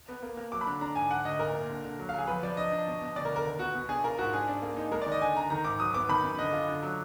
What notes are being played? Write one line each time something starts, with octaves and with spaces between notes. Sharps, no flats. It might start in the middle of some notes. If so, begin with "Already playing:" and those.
B3
A#3
A#3
F#3 D6
B5
D3
D4 A#5
G#2 G#5
D3 F#5
D2 D#5
A#2 A#4
A#2
D3
D3
F#3
F5
F#3 G#4
F3 B4
F3 D5
D4 D#5
D4
B2
B2
D2 D5
A#4
D3
A#4
D#2
B3 F#4
B2
D4 G#4
F4 A#4
G#2 F#4
D4 G#4
D4
A#3
D#4
G#3 A#4
D5
D#3
D#5
D3 G#5
D3 A#5
D#3 A#5
G#2 D6
F#3 D#6
B3 D6
D#3 B5
F#2
D3 D#5
F4
D3
F#3